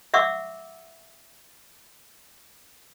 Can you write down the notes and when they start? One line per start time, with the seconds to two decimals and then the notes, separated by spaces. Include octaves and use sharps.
0.14 E5 F#5 C#6 D6 E6